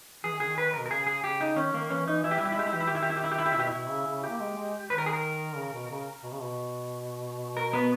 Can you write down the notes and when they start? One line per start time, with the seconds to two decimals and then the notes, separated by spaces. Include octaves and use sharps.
0.24 E3 G#4
0.33 D#3
0.40 C#3 G#4
0.48 D#3
0.58 B4
0.74 A#4
0.79 B2
0.86 A#4
0.90 C#3 G#4
1.07 G#4
1.24 C#3 G4
1.41 D#4
1.57 D#3 C#4
1.73 D#3 A#3
1.90 E3 C#4
2.07 E3 D#4
2.24 E3 E4
2.31 G4
2.38 G3 E4
2.45 G4
2.52 E4
2.57 G#3 G4
2.67 E4
2.73 E3 G4
2.80 E4
2.87 D#3 G4
2.95 E4
3.02 G4
3.09 E4
3.17 G4
3.24 E4
3.31 G4
3.38 E4
3.46 G4
3.52 E4
3.56 B2 G4
3.67 E4
3.73 B2
3.90 C#3
4.07 C#3
4.24 G4
4.29 A#3
4.40 G#3
4.57 G#3
4.90 D#3 B4
4.98 A#4
5.06 G#4
5.13 A#4
5.57 C#3
5.73 B2
5.90 C#3
6.23 B2
6.33 C#3
6.42 B2
7.57 A#4
7.73 B3